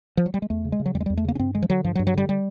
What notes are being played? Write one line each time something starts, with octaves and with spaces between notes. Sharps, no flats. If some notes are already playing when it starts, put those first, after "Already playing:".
F3
F#3
G3
G#3
E2 A3
C#3
G#3
C#3
F#3
E2 G3
G#3
E2 G3
A3
C#3 A#3
C#4
G2 C4
D3 G#3
F3
D3 F#3
G2 F3
F#3
G2
F#3
D3 G3
G3